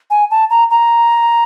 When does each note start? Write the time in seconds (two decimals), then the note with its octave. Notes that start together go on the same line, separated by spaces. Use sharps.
0.10 G#5
0.31 A5
0.50 A#5
0.70 A#5